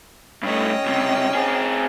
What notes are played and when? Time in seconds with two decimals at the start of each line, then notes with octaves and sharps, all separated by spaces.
0.43 G2 A3 C#4 D#5 G5
0.86 C#2 C3
1.35 C4 G#4